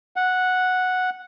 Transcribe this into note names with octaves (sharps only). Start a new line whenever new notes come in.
F#5